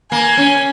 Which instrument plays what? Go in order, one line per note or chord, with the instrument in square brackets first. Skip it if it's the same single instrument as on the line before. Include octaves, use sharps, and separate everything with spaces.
[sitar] A#3 [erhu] G#5
[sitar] C#4